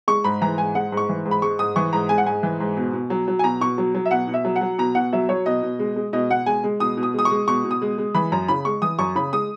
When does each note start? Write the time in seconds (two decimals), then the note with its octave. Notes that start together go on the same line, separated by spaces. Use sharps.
0.08 G#3 C#6
0.24 G#2 B5
0.41 E3 A#5
0.58 G#2 G#5
0.75 G#3 F#5
0.92 G#2
0.97 C#6
1.09 E3
1.25 G#2
1.31 B5
1.42 G#3 C#6
1.59 G#2 D#6
1.76 E3 C#6
1.93 G#2 A#5
2.09 G#3 G#5
2.18 F#5
2.26 G#2 G#5
2.43 E3
2.60 G#2
2.77 B2
2.93 B2
3.10 F#3
3.28 F#3
3.39 G#5
3.43 B2 A#5
3.61 B2 C#6
3.78 F#3
3.95 F#3
4.06 E5
4.11 B2 F#5
4.28 B2
4.34 E5
4.45 F#3
4.56 F#5
4.61 F#3
4.78 B2 A#5
4.95 B2 F#5
5.13 F#3 E5
5.29 F#3 C#5
5.46 B2 D#5
5.62 B2
5.79 G#3
5.96 G#3
6.13 B2 D#5
6.30 B2 F#5
6.46 G#3 G#5
6.64 G#3
6.80 B2 D#6
6.97 B2
7.03 D#6
7.14 G#3 D#6
7.25 C#6
7.31 G#3
7.48 B2 C#6
7.64 B2
7.71 D#6
7.82 G#3
7.98 G#3
8.15 E3 B5
8.32 F#2 A#5
8.48 C#3 B5
8.65 G#3 C#6
8.82 E3 D#6
8.99 F#2 C#6
9.15 C#3 B5
9.33 G#3 D#6